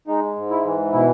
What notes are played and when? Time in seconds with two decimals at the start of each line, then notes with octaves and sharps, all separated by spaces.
0.08 G#3 D#4
0.36 G#2
0.50 E4
0.65 E3
0.93 B2 E4